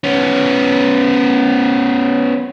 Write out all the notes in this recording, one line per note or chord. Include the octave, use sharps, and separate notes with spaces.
B3 C#4